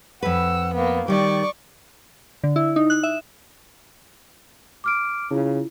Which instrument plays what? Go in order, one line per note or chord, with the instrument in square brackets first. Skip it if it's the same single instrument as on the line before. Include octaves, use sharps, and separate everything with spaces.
[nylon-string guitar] F2 B4 [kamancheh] F#5 E6
[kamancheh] A#3 B3
[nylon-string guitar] D#3 G3 [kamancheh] D5 C#6
[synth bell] D3
E4
D#4
F#6
E5
[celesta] D6 F6 D7
[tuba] C#3 [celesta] E4 F4